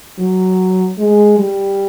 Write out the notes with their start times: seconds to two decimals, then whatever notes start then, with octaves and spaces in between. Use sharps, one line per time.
0.18 F#3
0.98 G#3
1.39 G3